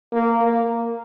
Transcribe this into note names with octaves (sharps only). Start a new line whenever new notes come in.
A#3
A#3